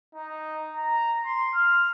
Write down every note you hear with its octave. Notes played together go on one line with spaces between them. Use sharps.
D#4
A#5
C6
F6